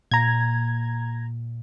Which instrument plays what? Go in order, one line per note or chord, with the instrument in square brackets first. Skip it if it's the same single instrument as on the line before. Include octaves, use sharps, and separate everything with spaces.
[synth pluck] A#2 [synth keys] A#5 G#6